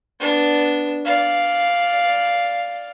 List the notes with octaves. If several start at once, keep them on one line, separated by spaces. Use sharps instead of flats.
B3 D4
D5 F5